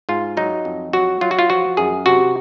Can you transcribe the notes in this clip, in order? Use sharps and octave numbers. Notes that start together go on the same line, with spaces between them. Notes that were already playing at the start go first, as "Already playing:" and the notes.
G#2 F4
F#3 D#4
F2
F#3 F#4
F#3 F4
F#4
F4
F3 F#4
F#2 G#4
C3 F#4